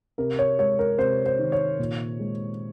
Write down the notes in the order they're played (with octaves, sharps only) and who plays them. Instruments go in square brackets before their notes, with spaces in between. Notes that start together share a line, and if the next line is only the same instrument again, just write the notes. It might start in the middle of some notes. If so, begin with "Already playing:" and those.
[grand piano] C3 A#4
C#5
G#3 C#5
A#4
C3 C5
C5
D#3
C#5
A#2
G#3